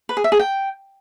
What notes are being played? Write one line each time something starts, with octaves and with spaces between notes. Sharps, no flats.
B4
G#4
E5
G#4
G5